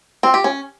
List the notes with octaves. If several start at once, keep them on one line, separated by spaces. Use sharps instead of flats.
C4
G4
C#4